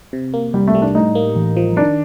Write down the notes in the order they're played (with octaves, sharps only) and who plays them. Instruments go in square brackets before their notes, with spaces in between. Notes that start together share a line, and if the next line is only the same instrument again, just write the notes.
[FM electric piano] C3
A#3
[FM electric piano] C2 [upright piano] G3
[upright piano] A3
[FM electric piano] G3
[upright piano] D4
[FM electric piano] A2 [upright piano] D#4
[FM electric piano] A#3
A1
F3
[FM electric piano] D#3 [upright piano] D4